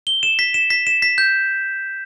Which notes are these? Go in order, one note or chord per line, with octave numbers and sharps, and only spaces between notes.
G7
E7
B6
E7
B6
E7
B6
G6